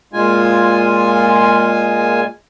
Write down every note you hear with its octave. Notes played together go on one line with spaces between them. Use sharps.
A#2 G#3 F4 G#5